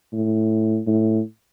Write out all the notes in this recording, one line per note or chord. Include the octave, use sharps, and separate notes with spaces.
A2
A2